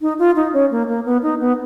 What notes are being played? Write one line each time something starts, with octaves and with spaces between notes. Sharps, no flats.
D#4
F4
D#4
C#4
A#3
A#3
B3
D#4
B3